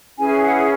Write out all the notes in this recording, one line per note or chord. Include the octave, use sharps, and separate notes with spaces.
C#4 E4 G#4 B4 G#5
F#5